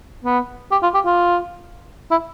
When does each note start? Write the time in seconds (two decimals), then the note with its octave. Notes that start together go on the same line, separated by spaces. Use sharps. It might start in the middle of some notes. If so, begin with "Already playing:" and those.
0.24 B3
0.72 G4
0.83 F4
0.94 G4
1.06 F4
2.11 E4